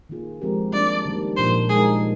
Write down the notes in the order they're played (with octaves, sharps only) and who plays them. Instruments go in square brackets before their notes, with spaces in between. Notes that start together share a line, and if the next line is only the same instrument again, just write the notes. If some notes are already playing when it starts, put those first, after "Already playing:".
[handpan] D#3 A#3 F4 G#4
F3 G#3 C4 G4 A#4
[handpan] G3 A#3 D4 [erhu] D5
[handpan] D#3 G3 A#3
[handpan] A#2 F3 A#3 D4 [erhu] C5
[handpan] G#3 D#4 A#4 [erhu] G#4